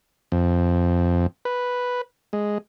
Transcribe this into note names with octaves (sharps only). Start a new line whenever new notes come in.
F2
B4
G#3